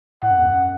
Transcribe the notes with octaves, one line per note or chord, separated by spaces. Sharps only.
A2 F#5
F#2
E2
F#2